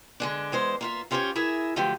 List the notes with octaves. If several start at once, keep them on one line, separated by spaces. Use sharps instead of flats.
D3 G#3 D4
E2 G#3 C5
A#3 F4 E5
C#4 F4 G4 A#4 C5 C#5
E4 G#4 A#4 E5
D3 F3 F#3 A3 G4